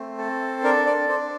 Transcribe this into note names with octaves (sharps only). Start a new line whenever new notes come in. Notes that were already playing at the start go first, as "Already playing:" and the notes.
Already playing: A3 C4
A4
D4 A#4
D5
D4 C5